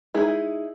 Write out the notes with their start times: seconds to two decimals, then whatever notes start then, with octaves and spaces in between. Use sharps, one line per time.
0.14 G#3 D#4 E4 G#4